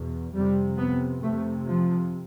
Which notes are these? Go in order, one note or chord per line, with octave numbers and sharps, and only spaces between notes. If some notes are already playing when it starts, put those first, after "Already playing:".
Already playing: E2 B2
F2 C3 G3
B3
F2 C3 A3
F3